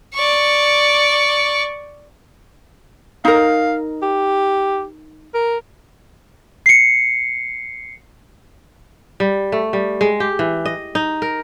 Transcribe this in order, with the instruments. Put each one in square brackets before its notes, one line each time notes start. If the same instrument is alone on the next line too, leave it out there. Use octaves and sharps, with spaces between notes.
[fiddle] D5 C#6
[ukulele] D#4 A#4 [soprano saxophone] F5
[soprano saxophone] G4
A#4
[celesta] C7 C#7
[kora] G3
A3
G3
G#3
G4
E3
D#5
D#4
A#4